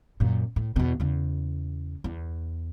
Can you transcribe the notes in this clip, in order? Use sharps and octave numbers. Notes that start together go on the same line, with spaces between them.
F#2 A#2
A2
E2 B2
E2 C#3
E2